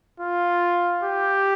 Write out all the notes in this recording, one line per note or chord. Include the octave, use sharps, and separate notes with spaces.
F4
G4